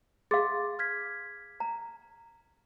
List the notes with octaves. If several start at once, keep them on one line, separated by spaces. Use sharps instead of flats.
G#4 F5 C6 D6 A6
F6 G#6 B6
A#5